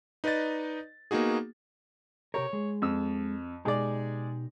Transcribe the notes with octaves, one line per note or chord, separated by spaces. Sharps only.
D#4 B4 D5 D#5 A6
A#3 B3 D#4 F#4 G#4
C3 G4 A#4 C#5
G#3
F2 E6
B2 G#3 D#4 G4 D5